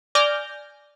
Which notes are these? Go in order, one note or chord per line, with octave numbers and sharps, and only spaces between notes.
D5 G#5 D6 F6 G6 A#6